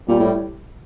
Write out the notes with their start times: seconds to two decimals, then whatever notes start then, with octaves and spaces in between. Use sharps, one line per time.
0.08 A#2 G3
0.20 A2